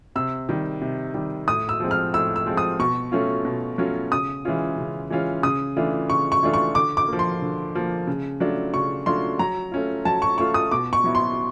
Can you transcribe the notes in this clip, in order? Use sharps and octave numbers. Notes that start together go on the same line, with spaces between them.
C3 E6
D#3 G3
C3
D#3 G3
A2 D#6
E6
F3 G#3 C4
F6
A2 E6
E6
F3 G#3 C4
D#6
B2 C#6
F#3 A3 C#4 F4
B2
F#3 A3 C#4 F4
C#3 D#6
E3 G#3 C#4 F4
C#3
E3 G#3 C#4 F4
C#3 D#6
E3 A3 D4 F4
C#3 C#6
C#6
E3 A3 D4 F4
C#6
D3 D6
D6
F3 A#3
C6
D3
F3 A#3
C#3
F#3 A3 D4 F4
C#3 C#6
F#3 A3 D4 F4 C6
F#3 A#5
A3 C#4 F4
F#3 A5
C#6
A3 C#4 F4 C#6
D#6
B2 D6
C#6
F#3 B3 E4
C6